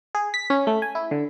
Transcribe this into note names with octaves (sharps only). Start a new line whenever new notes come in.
G#4
B6
C#4
A3
G#5
E4
D3